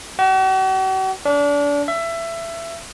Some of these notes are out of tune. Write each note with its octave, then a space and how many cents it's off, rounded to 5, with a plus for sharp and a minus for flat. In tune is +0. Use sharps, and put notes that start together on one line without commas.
F#4 +45
D4 -30
E5 +20